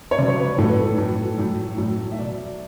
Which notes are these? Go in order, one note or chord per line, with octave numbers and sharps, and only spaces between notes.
C#5
C#3 F#3 D5
C#5
B4
A2 F#3 A4
B4
A4
A2 F#3
A2 F#3
A2 F#3
E5
B2 F#3 D5